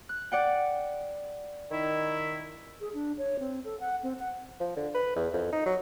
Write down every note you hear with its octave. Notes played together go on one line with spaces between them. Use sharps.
F#6
D5 F#5 G5
D#3 E4
G#4
D4
C#5
C4
A4
F#5
C4
F#5
F3
D3
B4
E2
F2
D#4
F#3